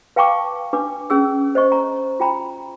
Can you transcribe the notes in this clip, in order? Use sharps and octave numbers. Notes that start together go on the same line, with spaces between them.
B4 F5 G5 A5 C#6 D6
D4 B4 D6
C#4 G#4 E6
C5 D#5 C#6
A#5
F4 G5 A#5 B5